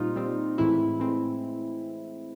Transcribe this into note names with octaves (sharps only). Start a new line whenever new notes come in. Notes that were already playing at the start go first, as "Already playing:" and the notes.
Already playing: A#2 G3 C4 D#4 F4
A#2 G3 C4
A2 E3 G#3 C4 E4
A2 E3 G#3 C4